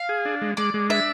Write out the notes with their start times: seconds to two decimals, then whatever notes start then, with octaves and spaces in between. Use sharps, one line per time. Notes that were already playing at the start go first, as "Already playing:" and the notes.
Already playing: F5
0.09 G#4
0.25 D4
0.42 G#3
0.57 G#3 D5
0.74 G#3
0.89 D4 E5